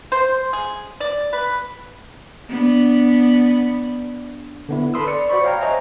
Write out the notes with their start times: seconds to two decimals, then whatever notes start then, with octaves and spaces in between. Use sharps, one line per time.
0.12 C5
0.53 G#4
1.00 D5
1.33 B4
2.49 B3 D4
4.69 D3 B3 E4
4.94 A4 B4 B5 C6 D#6 E6
5.07 D5 C#7
5.29 F#4 C5 D5 B5 C#6
5.43 C#5 F5 G5 A#5
5.61 C5 C#5 D#5 E5 G#5 A#5